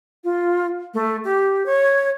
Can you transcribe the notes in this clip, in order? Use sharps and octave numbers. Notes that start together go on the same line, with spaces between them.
F4
A3
G4
C#5